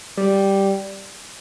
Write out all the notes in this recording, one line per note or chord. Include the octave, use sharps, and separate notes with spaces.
G3